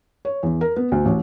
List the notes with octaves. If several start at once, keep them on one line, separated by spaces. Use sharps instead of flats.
C#5
E2
A#4
B3
D2
A1